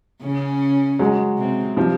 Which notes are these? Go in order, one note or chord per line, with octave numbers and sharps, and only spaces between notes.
C#3 C#4
F#3 G#3
C3 C4
F3 G3